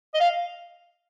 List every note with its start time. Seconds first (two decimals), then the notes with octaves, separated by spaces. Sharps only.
0.14 D#5
0.20 F5